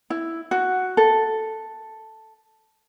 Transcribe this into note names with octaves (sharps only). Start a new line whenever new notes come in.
E4
F#4
A4